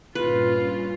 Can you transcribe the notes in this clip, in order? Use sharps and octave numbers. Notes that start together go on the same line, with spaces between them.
G2 A#2 C#4 F4 B4